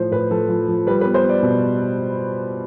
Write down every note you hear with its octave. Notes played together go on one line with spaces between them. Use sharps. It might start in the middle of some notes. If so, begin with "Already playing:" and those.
Already playing: A2 F3 C5
A2 B4
F3 A4
F3
F3
G3 B4
B3 B4
C5
B3
D5
B2